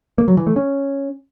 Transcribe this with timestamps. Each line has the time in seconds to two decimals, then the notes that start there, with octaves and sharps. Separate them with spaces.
0.18 A#3
0.28 F#3
0.37 E3
0.47 A3
0.56 C#4